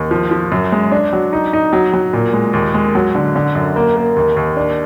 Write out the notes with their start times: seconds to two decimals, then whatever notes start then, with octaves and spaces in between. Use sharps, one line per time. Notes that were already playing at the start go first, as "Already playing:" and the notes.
Already playing: D#2
0.11 F3
0.31 F3
0.52 F#2
0.72 G#3
0.92 D4
1.13 F#3
1.33 D#4
1.53 D#4
1.73 F#3
1.93 F#3
2.13 A#2
2.33 G#3
2.53 D#2
2.74 G#3
2.95 F#3
3.15 D3
3.36 D3
3.55 F#2
3.76 A#3
3.96 A#3
4.16 D#2
4.36 D#2
4.56 D4